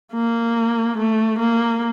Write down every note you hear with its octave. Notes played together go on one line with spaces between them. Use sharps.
A#3
A3
A#3